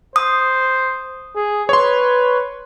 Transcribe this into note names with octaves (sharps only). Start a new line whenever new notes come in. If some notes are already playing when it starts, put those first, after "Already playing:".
C5 D#6
G#4
B4 C#5 C6